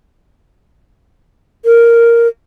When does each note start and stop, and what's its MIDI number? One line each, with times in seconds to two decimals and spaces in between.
1.65 2.28 70